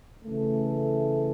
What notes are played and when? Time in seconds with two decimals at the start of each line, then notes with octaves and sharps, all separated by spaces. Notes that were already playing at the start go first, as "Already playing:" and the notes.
0.25 C#3 E3 A3